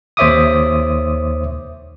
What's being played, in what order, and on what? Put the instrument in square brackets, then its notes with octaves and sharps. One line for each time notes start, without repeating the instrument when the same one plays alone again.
[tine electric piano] D#2 C5 C#5 E5 D6 D#6